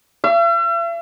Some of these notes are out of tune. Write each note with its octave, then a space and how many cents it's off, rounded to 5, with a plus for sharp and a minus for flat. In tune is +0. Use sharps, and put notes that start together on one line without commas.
E5 +45